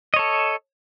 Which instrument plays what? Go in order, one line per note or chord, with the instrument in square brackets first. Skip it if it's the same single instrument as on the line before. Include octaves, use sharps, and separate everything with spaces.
[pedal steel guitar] D#5
C#5
A4